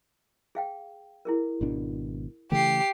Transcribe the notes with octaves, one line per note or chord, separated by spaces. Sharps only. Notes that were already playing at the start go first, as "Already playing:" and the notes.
G#4 F5 G5
E4 G#4 A#4
G#1 B2 D4
C#3 E3 A3 G4 C7